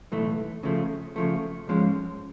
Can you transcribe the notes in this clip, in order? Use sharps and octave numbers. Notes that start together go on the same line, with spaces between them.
B1 A2 E3 A3
C#3 F3 A3
C#3 F3 A3
G#2 F3 G#3 C#4